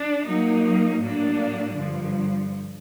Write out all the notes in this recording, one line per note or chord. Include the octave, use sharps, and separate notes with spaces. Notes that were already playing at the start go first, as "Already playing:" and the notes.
Already playing: D4
F#3 A#3 D#4
A2 F#3 A#3 D4
G2 D3 F3